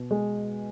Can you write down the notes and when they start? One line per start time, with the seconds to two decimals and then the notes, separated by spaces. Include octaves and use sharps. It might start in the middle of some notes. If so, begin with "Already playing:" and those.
Already playing: B2
0.11 G#3